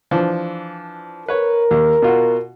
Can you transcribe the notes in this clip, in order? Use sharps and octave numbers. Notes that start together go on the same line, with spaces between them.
E3 F3 D4
A#4 B4 C#5
D#2
B2 F4 F#4